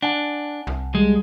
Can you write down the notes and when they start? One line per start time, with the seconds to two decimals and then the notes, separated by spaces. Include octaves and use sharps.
0.02 D4 F#5 G#5 A5
0.67 C2
0.95 G3 G#3